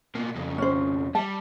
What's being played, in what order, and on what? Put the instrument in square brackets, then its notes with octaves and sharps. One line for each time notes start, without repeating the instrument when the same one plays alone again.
[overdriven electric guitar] B2 A#3
F2 C#3
[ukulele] C#4 C5
[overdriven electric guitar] G3 [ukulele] A5